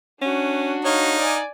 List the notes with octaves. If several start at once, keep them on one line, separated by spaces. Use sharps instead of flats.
C#4 D4 F#4
D#4 C#5 F5
D5 G#5